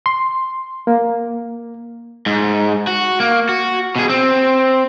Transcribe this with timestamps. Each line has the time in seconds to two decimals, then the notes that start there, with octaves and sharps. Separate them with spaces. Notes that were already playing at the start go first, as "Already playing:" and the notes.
0.06 C6
0.87 A#3
2.26 G#2
2.87 F#4
3.20 A#3
3.49 F#4
3.96 B2 G#4
4.09 C4